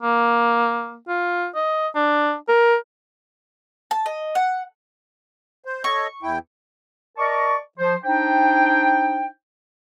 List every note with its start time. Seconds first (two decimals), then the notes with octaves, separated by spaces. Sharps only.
0.02 A#3
1.08 F4
1.55 D#5
1.95 D4
2.49 A#4
3.91 A5
4.06 D#5
4.35 F#5
5.65 C5
5.84 A4 C#5 D#5 C#6
6.23 E2 E4 G5
7.17 A#4 D5 D#5 A5 C#6
7.78 F3 C5
8.04 D4 D#4 C5 G5